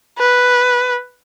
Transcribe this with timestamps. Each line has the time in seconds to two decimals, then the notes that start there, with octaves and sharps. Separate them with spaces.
0.19 B4